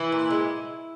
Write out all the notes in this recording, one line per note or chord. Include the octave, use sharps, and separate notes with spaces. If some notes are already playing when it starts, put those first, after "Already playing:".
Already playing: E3 E4
A#2
G#3